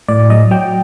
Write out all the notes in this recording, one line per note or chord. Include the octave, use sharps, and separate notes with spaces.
A2 D5
F#3 D#5
F#3 G5